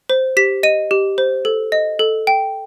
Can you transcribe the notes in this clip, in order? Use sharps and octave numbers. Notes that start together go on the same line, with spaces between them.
C5
G4 B6
D#5 D#7
G4
C5
A4
D#5
A4
G5